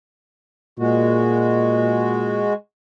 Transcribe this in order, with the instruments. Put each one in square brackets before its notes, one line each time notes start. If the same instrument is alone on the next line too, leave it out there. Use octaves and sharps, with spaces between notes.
[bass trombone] A#2 [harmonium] G#3 F#4